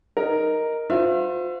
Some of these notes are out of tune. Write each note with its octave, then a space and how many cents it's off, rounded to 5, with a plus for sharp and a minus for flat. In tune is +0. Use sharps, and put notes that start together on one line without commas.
D#4 +0 A#4 +0
F4 +40 C5 -25 E5 +35